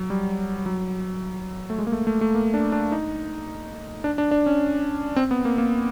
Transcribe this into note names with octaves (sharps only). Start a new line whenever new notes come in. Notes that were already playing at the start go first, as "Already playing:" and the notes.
Already playing: F#3
G3
F#3
A3
G#3
A#3
A3
A3
A3
A#3
D4
D4
D#4
D4
D4
D4
C#4
C4
B3
A#3
A#3